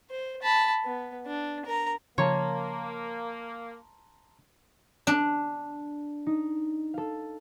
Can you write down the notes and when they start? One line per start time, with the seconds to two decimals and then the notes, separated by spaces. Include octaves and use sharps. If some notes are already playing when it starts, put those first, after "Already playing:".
0.10 C5
0.42 A5 B5
0.85 B3
1.27 D4
1.65 A#4 A#5
2.18 C#3 F3 A#3 C#5 A5 A#5 C6
5.07 D4
6.26 D#4
6.94 A4 F5